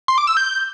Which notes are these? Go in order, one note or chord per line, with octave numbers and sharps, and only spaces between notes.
C6
D6
E6
G6